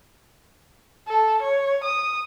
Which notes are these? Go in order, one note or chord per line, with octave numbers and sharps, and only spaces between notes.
A4
C#5
D#6